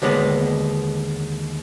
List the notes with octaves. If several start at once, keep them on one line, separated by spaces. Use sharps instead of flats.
D#2 D3 G#3 B3